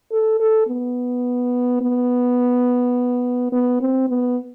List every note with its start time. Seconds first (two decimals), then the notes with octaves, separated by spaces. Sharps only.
0.12 A4
0.40 A4
0.67 B3
1.81 B3
3.52 B3
3.81 C4
4.09 B3